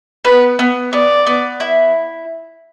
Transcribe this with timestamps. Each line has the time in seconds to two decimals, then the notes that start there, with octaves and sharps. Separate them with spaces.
0.25 B3 B4
0.59 B3
0.93 B3 D5
1.26 B3
1.60 E4